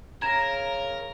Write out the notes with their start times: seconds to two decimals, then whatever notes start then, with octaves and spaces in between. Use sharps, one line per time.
0.22 C#3 A#4 A#5 G#6 A#6 E7